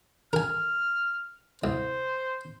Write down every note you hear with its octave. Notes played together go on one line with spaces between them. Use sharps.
A#4 G#5 F6
C2 C5